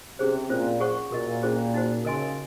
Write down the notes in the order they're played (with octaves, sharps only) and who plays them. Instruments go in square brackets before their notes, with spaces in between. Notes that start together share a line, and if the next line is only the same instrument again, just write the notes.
[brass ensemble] C3 [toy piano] C#4 G#4 C5
[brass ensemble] A#2 [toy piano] C#4 F4 C5
[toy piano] G#4 C5 F#5 C#6
[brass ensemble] A#2 [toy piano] F#4 A#4 D#5
[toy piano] C#4 F4 G#4 C5
D#4 F#4 C5
[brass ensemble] C#3 [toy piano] A#4 D#5 G#5 C6